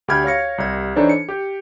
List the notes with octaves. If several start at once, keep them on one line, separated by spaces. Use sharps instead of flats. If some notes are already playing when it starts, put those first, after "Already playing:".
D2 G4 B5 F6 G#6
C#5 F5 A#6 C#7
C2 G4 G#6
E3 D4 D#4 A4 C5 C#5
C#7
G4